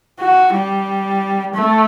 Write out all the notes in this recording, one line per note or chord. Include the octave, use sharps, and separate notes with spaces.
F#4
G3
A3